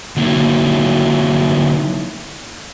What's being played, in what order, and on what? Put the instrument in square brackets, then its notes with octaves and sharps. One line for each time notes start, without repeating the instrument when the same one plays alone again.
[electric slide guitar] D3 F#3 A#3 D#4 E4